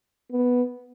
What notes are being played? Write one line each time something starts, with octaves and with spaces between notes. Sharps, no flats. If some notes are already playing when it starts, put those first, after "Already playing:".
B3